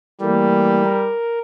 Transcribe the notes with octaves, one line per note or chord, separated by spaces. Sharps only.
E3 G3 A3 A#3
A#4